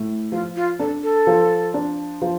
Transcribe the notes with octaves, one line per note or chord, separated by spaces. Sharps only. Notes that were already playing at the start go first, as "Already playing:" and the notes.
Already playing: A2
F3 F4
F4
D4 A4
A4
F3
D4
F3